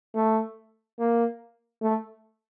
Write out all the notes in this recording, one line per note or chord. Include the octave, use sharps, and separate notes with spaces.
A3
A#3
A3